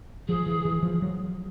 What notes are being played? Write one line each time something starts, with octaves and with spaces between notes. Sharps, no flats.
F3 G#4
E3
E3
F3
F#3